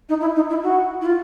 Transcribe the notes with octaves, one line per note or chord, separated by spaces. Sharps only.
D#4
E4
D#4
E4
F#4
E4
F4